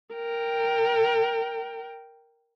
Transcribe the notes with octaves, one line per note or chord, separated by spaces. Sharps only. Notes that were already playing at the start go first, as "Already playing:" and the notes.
A#4 G5